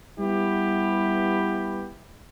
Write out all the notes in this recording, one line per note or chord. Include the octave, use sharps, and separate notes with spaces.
G3 B3 E4 G4 B4